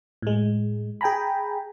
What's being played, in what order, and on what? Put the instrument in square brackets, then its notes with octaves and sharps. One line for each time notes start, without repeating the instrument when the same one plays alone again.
[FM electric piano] A2 G#3
G#4 G5 G#5 A#5 B5